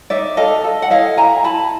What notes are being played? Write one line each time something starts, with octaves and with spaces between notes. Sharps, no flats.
D#4 D5 E5
A4 D#5 F5
A4
F#5
E4 D#5 F5
E4 G#5 A#5
E4 A5 B5